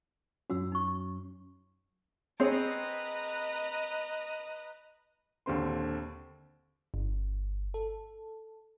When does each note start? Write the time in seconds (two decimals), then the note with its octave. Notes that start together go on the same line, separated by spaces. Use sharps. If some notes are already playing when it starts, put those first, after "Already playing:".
0.50 F#2 F#3 C#4 F#4 F#5 E6
0.72 D#4 C#6
2.40 C4 G#4 B4 C#5 D#5 A#5
5.46 A#1 D#2 D3 C4 C6
6.94 G1
7.74 A4